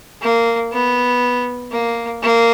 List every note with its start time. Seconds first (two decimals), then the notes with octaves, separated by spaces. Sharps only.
0.22 A#3
0.72 B3
1.72 A#3
2.23 A#3